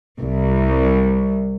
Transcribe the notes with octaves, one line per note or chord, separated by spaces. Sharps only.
C2